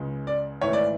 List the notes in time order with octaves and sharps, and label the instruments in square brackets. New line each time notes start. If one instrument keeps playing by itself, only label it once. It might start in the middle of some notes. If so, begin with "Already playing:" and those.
Already playing: [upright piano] C#2 C#3 G#3
[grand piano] D5
[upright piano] G#1 G#2 E3 A3 E4 [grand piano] C#5
[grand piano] D5